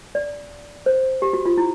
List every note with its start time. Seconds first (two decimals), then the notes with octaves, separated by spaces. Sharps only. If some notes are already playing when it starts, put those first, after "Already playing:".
0.15 D5
0.86 C5
1.22 G4
1.33 F#4
1.46 F4
1.57 E4